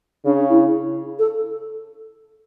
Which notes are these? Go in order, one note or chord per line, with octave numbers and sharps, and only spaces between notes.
C#3 D4
E4
A4